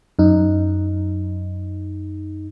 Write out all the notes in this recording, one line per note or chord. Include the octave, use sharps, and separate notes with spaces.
F#2 D#4